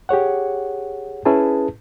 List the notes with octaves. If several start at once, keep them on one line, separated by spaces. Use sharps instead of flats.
G4 G#4 C#5 F#5
C#4 E4 G#4 B4 A5